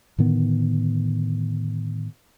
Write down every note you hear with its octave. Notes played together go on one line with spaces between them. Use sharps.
A2 D3 D#3 B3